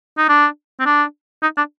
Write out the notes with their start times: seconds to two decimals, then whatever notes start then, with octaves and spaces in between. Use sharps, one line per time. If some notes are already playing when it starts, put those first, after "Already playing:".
0.17 D#4
0.29 D4
0.79 C4
0.86 D4
1.42 D#4
1.57 D4